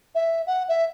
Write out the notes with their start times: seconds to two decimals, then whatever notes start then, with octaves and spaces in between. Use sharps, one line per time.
0.15 E5
0.47 F#5
0.68 E5